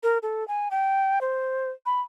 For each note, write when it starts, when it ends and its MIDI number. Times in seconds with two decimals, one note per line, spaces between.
0.03 0.18 70
0.23 0.47 69
0.48 0.69 80
0.71 1.19 79
1.21 1.70 72
1.86 2.01 83